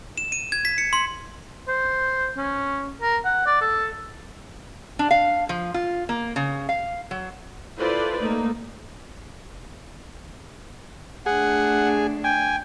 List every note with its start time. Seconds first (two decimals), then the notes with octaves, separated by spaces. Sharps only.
0.18 E7
0.32 D#7
0.52 G#6
0.65 B6
0.78 C#7
0.93 C6
1.68 C5
2.37 C#4
3.02 A#4
3.25 F#5
3.47 D5
3.61 A4
4.99 D4
5.11 F5
5.49 F3
5.74 F4
6.09 A#3
6.36 C#3
6.69 F5
7.11 F#3
7.78 E4 F4 A4 B4 C5 D5
8.19 A3 A#3 D#4
11.26 A3 D4 G#4 F#5
12.24 G5 G#5